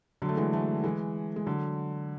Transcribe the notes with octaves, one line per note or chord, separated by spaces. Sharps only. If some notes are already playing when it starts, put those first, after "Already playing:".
D3 F#3
A3
E3 G#3
F#3 A3
E3 G#3
G#3
D3 F#3